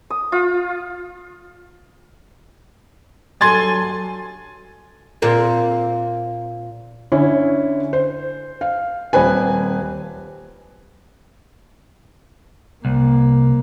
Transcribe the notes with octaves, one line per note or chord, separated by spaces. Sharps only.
D#6
F4
G2 F#3 A4 G#5 C6 G#6 A6
A#2 A#3 C4
D3 C#4 E4
C5
F5
D#1 C4 B4 G#5
C2 A#3